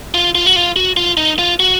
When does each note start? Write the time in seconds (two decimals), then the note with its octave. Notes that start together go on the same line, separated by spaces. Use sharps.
0.14 F4
0.35 F4
0.46 F#4
0.56 F4
0.76 F#4
0.97 F4
1.17 D#4
1.39 F4
1.60 F#4